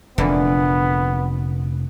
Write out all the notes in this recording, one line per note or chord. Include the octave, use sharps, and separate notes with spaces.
F1 A#2 D3 E3 B3